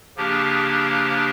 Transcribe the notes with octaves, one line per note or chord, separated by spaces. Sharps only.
C#3 F3 A#3 D4 G4